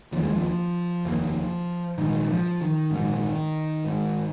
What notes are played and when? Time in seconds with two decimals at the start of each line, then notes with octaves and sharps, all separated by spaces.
0.12 F1 D#2 F3
0.22 G#3
0.31 F3
1.05 F1 D#2
1.98 A#1 G#2 D#3
2.30 F3
2.61 D#3
2.91 G#2 D#3
2.97 A#1
3.85 G#1 G#2